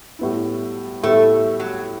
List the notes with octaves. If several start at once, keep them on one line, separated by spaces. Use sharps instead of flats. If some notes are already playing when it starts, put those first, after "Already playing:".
A2 G3 B3 E4
A2 G3 A3 B3 E4
F#3